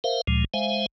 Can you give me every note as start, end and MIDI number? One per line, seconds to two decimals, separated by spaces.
0.04 0.21 70
0.04 0.21 72
0.04 0.21 76
0.04 0.21 77
0.27 0.44 38
0.27 0.44 46
0.27 0.44 53
0.27 0.44 56
0.54 0.86 56
0.54 0.86 72
0.54 0.86 76
0.54 0.86 77
0.54 0.86 80